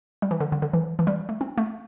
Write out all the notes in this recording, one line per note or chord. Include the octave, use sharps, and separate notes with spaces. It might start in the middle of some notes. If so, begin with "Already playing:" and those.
G3
E3
D3
D3
D3
E3
E3
G3
A3
C4
A3